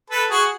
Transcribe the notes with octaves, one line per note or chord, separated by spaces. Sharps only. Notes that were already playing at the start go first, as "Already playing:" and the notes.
A4 B4
F#4 G#4